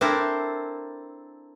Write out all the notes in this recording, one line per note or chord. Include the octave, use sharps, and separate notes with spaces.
C4 D4 E4 A4 A#4 C5